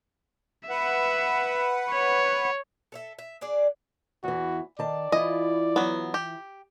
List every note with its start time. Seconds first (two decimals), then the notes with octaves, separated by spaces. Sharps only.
0.69 B4 E5 F#5
1.92 C#5
2.92 A4 C#5 E5
3.19 E5
3.41 D4 G#4 D5
4.24 E2 E3 F#4
4.79 D#3 D5 A5
5.12 E3 E4 F4 D#5
5.76 F#3 B3
6.14 G4